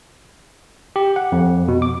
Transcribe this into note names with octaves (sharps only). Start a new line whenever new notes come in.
G4
F#5
F2
B2
D6